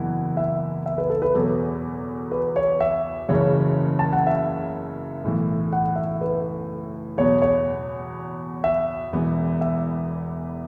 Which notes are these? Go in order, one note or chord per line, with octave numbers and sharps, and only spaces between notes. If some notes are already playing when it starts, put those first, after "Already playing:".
Already playing: F#1 E2 E3 B3 E4 F#5
E5
E5
B4
A4
B4
E2 B2 F#3 B3 A4
B4
C#5
E5
F#1 F#2 C#3 E3 C#4 C#5
A5
F#5
E5
B1 A2 E3
F#5
E5
B4
E2 B2 F#3 C#5
C#5
E5
E1 E2 E3 B3
E5